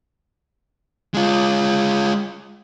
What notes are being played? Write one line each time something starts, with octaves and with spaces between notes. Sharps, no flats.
G#3 F4